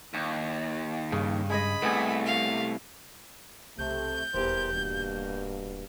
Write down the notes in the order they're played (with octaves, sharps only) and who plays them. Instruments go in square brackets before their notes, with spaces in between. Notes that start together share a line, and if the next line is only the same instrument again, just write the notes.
[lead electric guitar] D#2
[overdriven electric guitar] G2 [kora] C#3
[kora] G#3 G#4 D#5 [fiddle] B5
[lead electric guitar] C2 [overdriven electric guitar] A3 [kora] B3 G#4
[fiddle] F5
[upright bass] B1 [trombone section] C3 A3 [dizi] G6
[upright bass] D#1 [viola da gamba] E2 G4 [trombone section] E3 A#4 C5
[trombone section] G2 B2 [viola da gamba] A#3